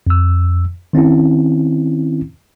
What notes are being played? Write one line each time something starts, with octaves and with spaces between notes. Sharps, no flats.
F2 E6
D#3 C4 C#4 E4